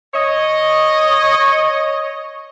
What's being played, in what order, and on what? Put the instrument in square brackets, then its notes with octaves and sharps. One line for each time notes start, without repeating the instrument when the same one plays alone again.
[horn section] C#5 D#5